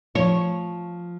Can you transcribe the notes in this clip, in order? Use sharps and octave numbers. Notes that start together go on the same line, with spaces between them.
F3 C#5